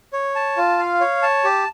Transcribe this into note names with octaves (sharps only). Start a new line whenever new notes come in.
C#5
A5
F4
F5
C#5
A5
G4